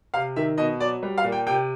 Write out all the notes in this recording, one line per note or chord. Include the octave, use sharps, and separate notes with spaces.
C3 F5
D#3 E5
B2 D#5
F#3 D5
G3
F5
A#2
G5
C3 G5